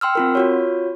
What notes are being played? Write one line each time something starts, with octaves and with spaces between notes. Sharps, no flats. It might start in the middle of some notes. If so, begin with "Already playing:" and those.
G5 C6 E6 F6
C4 F4 A#4
F4 F#4 C#5